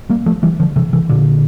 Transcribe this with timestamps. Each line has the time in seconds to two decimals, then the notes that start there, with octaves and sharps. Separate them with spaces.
0.10 G3 A#3
0.26 F3 A3
0.43 E3 G3
0.60 D3 F3
0.76 C3 E3
0.93 C3 E3
1.09 A#2 D3